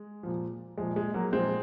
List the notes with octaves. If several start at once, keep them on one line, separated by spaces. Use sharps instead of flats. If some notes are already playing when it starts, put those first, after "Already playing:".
Already playing: G#3
A#2 F3
A#2 F3 G#3
G#3
F#3 A#3
A#2 F3 G#3 C4